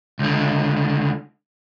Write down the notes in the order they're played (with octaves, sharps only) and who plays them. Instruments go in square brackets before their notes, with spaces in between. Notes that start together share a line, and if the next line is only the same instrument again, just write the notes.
[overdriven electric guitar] C#2 D3